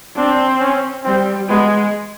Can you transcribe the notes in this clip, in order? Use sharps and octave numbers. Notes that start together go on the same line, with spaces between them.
C4 D4
C#4
G3 C4
G#3 B3